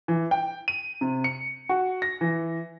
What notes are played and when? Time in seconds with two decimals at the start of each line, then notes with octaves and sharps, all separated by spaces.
0.08 E3
0.31 G5
0.68 D#7
1.01 C3
1.24 C#7
1.69 F#4
2.02 A#6
2.21 E3